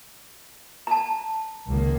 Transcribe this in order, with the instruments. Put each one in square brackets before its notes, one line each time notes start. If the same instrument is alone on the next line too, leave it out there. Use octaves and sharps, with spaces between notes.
[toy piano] A5 A#5
[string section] C#2 D#3 A#3